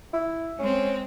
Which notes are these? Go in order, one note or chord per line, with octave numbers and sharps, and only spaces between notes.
E4
G#3 C4 C#4